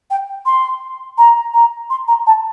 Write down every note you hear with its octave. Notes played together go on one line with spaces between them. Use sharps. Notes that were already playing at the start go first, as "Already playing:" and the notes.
G5
C6
A#5
A#5
C6
A#5
A5